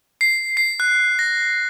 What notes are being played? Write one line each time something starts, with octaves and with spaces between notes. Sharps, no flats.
C7
C7
F#6
A#6